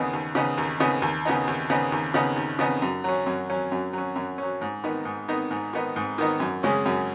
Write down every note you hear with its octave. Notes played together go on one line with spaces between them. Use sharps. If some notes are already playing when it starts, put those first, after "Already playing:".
Already playing: D#2 C#3 B3 D#4
D#2
C#3 B3 D#4
D#2
C#3 B3 D#4
D#2
C#3 B3 D#4
D#2
C#3 B3 D#4
D#2
C#3 B3 D#4
D#2
C#3 B3 D#4
F#2
F#3 C#4
F#2
F#3 C#4
F#2
F#3 C#4
F#2
F#3 C#4
G#2
D#3 B3 D#4
G#2
D#3 B3 D#4
G#2
D#3 B3 D#4
G#2
D#3 B3 D#4
F#2
C#3 G#3 C#4
F#2